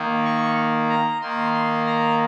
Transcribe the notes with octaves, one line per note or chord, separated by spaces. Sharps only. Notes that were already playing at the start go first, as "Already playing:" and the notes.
Already playing: D#3 A#3
C#6
A#5
D#3 A#3 C6
C6
A#5